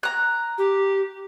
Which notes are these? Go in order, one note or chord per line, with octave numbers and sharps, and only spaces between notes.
A#5 F#6
G4